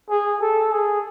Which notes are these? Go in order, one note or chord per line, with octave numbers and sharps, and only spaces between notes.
G#4
A4
G#4